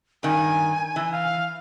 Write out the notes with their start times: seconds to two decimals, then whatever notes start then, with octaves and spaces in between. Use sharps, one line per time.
0.23 G2 D#3 G#5
0.96 E3
1.12 F5